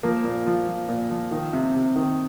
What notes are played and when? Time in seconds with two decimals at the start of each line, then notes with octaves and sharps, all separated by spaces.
0.03 F3 A#3
0.25 A#2
0.46 F3
0.68 F3
0.89 A#2
1.10 F3
1.31 D#3
1.53 C3
1.74 C3
1.96 D#3